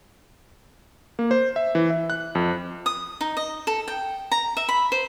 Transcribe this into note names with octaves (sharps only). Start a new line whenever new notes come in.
A#3
C5
E5
E3
E5
F#6
F2
D#6
D#4
D#5
A4
G5
A#5
E5
B5
C5